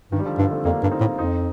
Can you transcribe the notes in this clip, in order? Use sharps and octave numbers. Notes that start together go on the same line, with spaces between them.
G2 D#3
G3
D3 F3
G2 D3 F3
A3 C4
F2 A#3 D4
G2
C4 D#4
A2
F2 C4 D#4